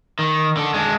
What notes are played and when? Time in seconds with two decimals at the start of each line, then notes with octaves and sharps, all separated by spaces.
0.19 D#3
0.57 D3
0.74 G#3 D4